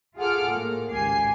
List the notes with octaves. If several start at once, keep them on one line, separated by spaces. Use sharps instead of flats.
F4 G#4 A4 F#5 D6 F6
A2 A#3
G#1 C#2 G4 G#5 C7